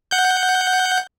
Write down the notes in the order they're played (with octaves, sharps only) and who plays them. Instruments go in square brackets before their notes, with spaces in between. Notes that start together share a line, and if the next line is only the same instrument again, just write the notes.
[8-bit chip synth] F#5 G6